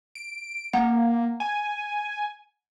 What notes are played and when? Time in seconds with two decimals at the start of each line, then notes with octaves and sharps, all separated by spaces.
0.15 D7
0.73 A#3 F#5 A#5
1.40 G#5